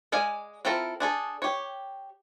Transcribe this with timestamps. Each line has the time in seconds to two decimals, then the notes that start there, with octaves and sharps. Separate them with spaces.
0.12 G#3 D5 F5 G#5
0.65 C4 E4 F4 A4 A#4
1.00 D4 G#4 A4
1.42 G4 C#5